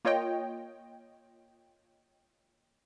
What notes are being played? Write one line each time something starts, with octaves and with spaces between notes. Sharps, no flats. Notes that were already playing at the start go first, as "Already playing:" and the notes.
A#3 F4 C#5 D#5 G5